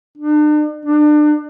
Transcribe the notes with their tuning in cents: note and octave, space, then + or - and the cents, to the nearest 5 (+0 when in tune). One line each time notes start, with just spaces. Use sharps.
D4 +40
D4 +30